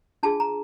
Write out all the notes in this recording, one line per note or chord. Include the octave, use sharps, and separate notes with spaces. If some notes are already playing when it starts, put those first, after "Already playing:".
D4 F4 G#4 A5
A#5